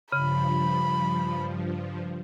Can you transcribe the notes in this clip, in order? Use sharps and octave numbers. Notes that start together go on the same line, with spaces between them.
G2 C#3 F3 B5